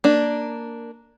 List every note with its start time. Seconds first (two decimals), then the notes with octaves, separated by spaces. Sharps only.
0.04 A#3 D4